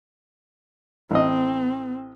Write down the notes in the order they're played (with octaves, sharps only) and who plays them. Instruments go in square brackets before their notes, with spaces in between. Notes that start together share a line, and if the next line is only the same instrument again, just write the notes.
[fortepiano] A1 D#5 [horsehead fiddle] C4